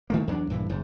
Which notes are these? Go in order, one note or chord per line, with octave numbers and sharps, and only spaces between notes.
D#3 A3 A#3
E2 F#3 C4 D4
A#1 G2 D3 E3
F#1 G#2